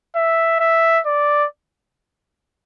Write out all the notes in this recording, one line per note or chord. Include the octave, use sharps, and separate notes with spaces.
E5
E5
D5